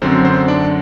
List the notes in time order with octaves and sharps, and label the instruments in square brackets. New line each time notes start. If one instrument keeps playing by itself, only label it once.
[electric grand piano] F#2 D3 F#3 C4 C5
C4 C5
D4 D5